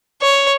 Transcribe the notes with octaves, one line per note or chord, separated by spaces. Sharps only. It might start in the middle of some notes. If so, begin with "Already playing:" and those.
C#5